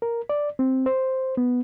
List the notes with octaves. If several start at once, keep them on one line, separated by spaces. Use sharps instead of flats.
A#4
D5
C4
C5
B3